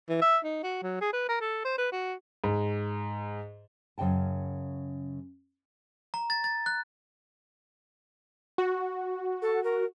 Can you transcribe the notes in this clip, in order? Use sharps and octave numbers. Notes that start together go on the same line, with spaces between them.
E3
E5
D#4
F#4
F#3
G#4
B4
A#4
A4
C5
B4
F#4
G#2
F#2 C#3 D#5 G5 A5
A#5
A6
A6
F#6
F#4
A4
A#4